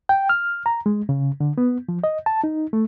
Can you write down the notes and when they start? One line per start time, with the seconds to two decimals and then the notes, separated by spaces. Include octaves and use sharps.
0.09 G5
0.29 F6
0.66 A#5
0.86 G#3
1.09 C#3
1.40 D3
1.58 B3
1.89 F3
2.04 D#5
2.26 A5
2.44 D#4
2.73 A3